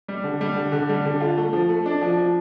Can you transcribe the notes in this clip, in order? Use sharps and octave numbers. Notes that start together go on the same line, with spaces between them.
G3
D3
G3
D3
D3
G3
D3
F4
A3
F3
A3
D4
F3
F3